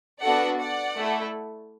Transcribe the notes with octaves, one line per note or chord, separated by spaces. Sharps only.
B3 D4 F#4 A4 D5 F#5
D5 F#5
A3 E4 A4